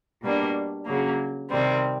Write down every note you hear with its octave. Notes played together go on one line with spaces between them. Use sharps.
B2 G3 A#3 D4
C#3 F#3 A#3
C3 D#3 G3 C4